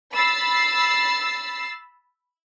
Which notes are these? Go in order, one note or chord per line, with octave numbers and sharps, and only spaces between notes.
B5 E6 A6 C7